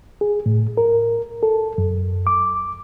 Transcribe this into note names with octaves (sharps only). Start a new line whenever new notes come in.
G#4
A2
A#4
A4
F#2
D6